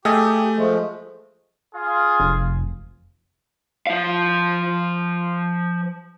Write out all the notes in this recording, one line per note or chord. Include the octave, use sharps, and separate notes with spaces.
A3 G4 G#4 D#5 E5
F3 G#3 A3
F4 G#4
F1
F3 F5